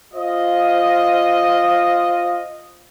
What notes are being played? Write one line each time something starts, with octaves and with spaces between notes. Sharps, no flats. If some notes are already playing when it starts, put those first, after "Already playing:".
F4 C5 D#5